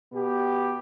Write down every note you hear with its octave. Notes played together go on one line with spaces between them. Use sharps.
B2 B3 G4